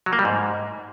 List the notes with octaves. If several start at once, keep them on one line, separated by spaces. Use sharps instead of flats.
F#3
A#3
G3
G#2